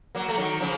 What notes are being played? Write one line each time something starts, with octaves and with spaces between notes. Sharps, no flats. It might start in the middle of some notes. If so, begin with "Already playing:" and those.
F#3 A#3
A3
D#3 F#3
C#3 F3